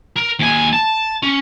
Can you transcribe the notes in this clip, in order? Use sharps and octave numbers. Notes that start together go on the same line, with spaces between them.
A#4
D#2 G#5
A5
C#4